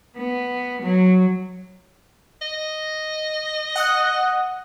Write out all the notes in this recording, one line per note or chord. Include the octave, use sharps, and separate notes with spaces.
B3
F#3
D#5
F#5 D#6 F#6